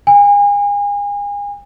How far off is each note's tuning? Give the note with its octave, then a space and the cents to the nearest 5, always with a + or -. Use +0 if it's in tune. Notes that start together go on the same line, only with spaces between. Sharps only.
G#5 -35